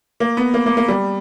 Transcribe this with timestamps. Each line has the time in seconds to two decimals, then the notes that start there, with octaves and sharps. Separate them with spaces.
0.20 A#3
0.37 B3
0.54 A#3
0.66 A#3
0.77 A#3
0.88 G3